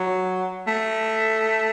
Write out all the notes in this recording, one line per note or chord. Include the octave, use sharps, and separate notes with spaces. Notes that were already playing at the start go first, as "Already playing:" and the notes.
Already playing: F#3
A3